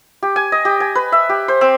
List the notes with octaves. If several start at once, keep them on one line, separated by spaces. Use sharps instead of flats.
G4
G#5
D#5
G4
G#5
B4
E5
G4
C5
C4